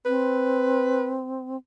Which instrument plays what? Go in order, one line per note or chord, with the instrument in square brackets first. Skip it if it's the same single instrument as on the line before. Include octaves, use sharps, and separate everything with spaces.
[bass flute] C4 [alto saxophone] B4